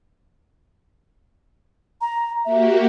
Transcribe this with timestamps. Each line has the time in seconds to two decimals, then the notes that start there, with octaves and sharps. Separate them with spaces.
2.01 A#5
2.45 A#3 F#4 G4 E5